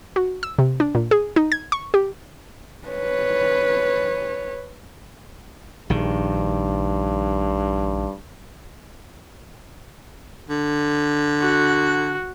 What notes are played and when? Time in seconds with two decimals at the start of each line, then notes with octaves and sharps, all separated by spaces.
0.16 F#4
0.43 E6
0.59 C3
0.80 D4
0.95 A#2
1.11 G#4
1.36 D#4
1.52 G#6
1.72 C#6
1.94 G4
2.88 B4 C#5
5.90 A#1 G2 D#3
10.50 D3
11.41 F#4